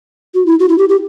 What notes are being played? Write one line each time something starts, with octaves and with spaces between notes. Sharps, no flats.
F#4
E4
F#4
E4
G4
G4